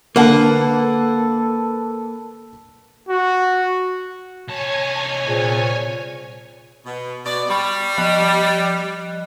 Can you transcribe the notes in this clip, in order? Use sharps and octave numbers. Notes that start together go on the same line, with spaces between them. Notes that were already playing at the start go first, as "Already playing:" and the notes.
D3 A#3 A4 B4 F#5 A5
F#4
C2 C#5 G#5 A5
A#2 C4 G#4 C5
B2
B2 D5
G3 B5 C#6
F3 D#5 F#6